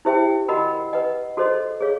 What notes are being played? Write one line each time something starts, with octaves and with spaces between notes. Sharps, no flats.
E4 G4 C5 E5 G5
F#4 A#4 D#5 F#5 B5
B4 D#5 F#5
F#4 A4 C5 D#5
G#4 C#5 F5